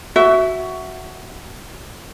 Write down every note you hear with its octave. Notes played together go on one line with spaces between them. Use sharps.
F#4 E5